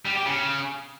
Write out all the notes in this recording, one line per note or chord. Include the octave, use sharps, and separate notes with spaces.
G3
G4
C#3